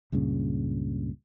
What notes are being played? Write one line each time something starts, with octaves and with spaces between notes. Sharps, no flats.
C#2 G2 A#2 C#3